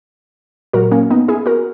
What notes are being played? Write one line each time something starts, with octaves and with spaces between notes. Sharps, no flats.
A#2 F#3 F#4 A#4
A#3 C#4
B3 D#4
E4 G#4
F#4 A#4